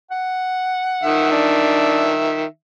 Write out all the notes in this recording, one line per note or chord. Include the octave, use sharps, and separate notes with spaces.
F#5
D#3 E5
D4